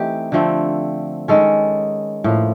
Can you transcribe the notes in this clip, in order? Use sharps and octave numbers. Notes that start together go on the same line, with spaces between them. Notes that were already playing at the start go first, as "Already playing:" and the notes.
Already playing: E3 A3 C4 D#4 G4
D3 F3 A3 C4
D#3 G#3 C#4 A4
A2 F3 A#3